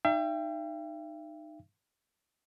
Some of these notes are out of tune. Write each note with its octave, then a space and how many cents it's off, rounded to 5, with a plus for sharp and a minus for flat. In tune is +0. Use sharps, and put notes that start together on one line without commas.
D#4 -20 E5 +45 G5 +10